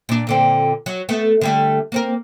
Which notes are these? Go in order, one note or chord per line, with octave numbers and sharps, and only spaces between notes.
A#2 D4
A#2 D3 C4
F#3
A3 B3
D3 G3 A3
A#3 C4 A#4